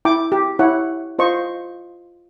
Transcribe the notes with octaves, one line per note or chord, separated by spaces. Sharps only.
E4 G5 D6
G4
E4 C#5 F#5
F4 C5 D#5 C#6